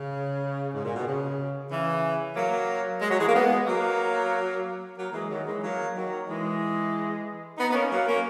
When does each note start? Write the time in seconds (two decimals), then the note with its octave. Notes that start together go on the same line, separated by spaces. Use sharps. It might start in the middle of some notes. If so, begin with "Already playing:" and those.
Already playing: C#3
0.74 G#2
0.83 A#2
0.95 B2
1.06 C#3
1.70 C#3 E3
2.35 F#3 A#3
3.00 G#3
3.10 F#3
3.19 E3 G#3
3.27 A#3
3.33 G#3 B3
3.66 F#3 A#3
4.96 F#3 A#3
5.12 E3 G#3
5.29 D#3 F#3
5.45 E3 G#3
5.62 F#3 A#3
5.95 D#3 F#3
6.28 E3 G#3
7.58 B3 D#4
7.70 B3
7.74 A#3 C#4
7.90 F#3 A#3
8.07 A#3 C#4